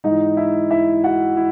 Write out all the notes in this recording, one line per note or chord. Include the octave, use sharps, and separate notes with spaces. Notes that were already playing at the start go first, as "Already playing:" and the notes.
G#2 E3 D#4 D#5
E4 E5
E4 E5
F#4 F#5
E4